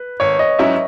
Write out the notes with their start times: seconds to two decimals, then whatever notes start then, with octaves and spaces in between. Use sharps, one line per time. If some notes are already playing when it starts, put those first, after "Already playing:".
Already playing: B4
0.20 G#1 C#5
0.39 D#5
0.59 G#2 F#3 C#4 E4 E5